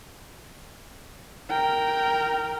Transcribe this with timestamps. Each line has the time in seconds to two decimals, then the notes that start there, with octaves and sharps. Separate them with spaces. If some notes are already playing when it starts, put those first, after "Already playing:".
1.50 A#4 G5